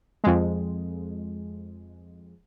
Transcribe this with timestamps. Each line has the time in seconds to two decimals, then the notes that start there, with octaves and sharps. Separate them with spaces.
0.24 F2 G#3